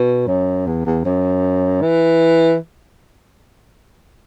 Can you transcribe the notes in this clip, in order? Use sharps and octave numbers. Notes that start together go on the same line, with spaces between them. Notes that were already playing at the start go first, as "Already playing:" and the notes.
Already playing: B2
F#2
E2
E2
F#2
E3